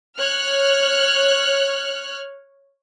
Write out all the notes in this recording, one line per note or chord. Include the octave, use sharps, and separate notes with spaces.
C#5 F6 F#6